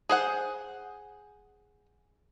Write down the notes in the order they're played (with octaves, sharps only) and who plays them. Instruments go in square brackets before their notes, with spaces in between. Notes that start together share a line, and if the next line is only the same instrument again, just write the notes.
[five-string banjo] G#4 C5 F#5